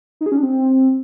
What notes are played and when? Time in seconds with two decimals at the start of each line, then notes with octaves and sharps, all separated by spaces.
0.21 D#4
0.26 G#4
0.32 C#4
0.37 D4
0.43 C4